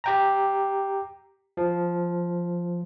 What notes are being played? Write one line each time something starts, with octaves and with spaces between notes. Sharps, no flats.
G4 G5 A#5
F3